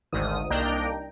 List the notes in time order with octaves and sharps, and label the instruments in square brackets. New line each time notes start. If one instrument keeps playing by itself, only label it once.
[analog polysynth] G#1 D2 G#2 D3 D#3 D#6
C2 A#3 D4 D#4 G5 A#5